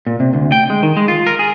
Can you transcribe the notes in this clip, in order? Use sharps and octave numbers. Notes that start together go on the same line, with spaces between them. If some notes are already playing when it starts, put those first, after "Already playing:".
A#2
C3
D2
G5
G#3
D#3
G#3
F4
A#4
G#4